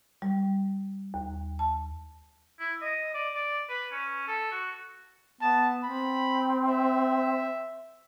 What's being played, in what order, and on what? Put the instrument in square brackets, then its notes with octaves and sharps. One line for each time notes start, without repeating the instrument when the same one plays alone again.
[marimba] G3
D#2
A5
[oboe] E4
D#5
D5
D5
B4
C#4
A4
F#4
[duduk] B3 [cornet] A5
[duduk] C4 [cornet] B5
[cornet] E5